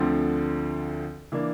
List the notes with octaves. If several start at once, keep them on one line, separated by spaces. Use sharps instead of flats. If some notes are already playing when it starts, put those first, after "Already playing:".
Already playing: D2 D3 F3 C4
E3 A#3 D4